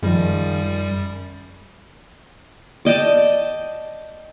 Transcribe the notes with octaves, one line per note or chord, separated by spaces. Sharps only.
F#2 D#3 F3 G3 G#3
D5 D#5 G5 A5